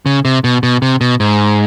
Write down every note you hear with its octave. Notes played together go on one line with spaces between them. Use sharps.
C#3
C3
B2
B2
C3
B2
G#2